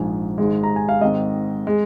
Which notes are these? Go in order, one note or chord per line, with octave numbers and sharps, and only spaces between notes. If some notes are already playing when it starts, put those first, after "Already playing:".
Already playing: A#1 G#2 F3 G#5
G#1 G#2 G#3
A#5
G#5
F5
G#2 D#3 C4 D#5
G#3